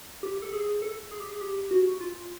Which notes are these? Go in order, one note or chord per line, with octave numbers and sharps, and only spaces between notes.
G4
A4
G#4
A4
G#4
G4
G#4
G4
F#4
F4